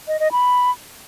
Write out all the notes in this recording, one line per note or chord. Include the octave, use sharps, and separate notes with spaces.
D#5
D#5
B5